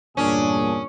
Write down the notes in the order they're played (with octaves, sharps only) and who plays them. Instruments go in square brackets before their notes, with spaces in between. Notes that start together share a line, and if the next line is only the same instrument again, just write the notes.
[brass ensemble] E2 G2 A#2 [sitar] C#4 [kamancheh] D4 [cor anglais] G#4